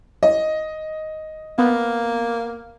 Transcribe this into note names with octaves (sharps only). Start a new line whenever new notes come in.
D#5
A#3 B3